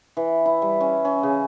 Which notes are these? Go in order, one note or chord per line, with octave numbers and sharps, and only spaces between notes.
E3
E4
G3
C#4
C#4
C#3